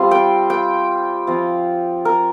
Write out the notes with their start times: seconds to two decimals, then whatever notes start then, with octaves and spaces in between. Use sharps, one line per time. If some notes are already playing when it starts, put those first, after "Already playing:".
Already playing: G3 C4 F4 C6
0.11 G5
0.50 G5
1.27 F3 C4 F4
2.05 A#4